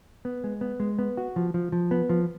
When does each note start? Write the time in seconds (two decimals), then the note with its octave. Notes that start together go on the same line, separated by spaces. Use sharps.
0.25 B3
0.44 G#3
0.61 B3
0.80 G#3
0.99 B3
1.17 F#4
1.36 F3
1.54 F3
1.72 F3
1.91 B3
2.09 F3